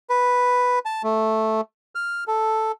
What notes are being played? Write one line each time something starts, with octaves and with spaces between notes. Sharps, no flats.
B4
A5
A3
F6
A4